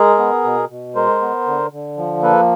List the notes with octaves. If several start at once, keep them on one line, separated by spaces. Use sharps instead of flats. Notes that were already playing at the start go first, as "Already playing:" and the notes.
Already playing: G#3 G#4 A#4
B3
B2
B2
G#3 A#4 C5
B3
D3
D3
F3
A#3 A4 B4